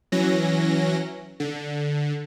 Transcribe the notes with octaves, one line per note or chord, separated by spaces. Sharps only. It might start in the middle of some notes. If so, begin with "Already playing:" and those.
E3 F#3 C#4 A#6
D3